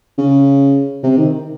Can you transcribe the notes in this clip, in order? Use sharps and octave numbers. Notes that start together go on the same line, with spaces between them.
C#3
C3
D#3